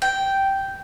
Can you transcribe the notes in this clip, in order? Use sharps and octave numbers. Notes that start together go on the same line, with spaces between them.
G5